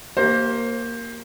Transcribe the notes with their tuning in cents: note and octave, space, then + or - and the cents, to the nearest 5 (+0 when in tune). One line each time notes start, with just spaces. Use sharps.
A#3 +0 G4 -35 C5 +20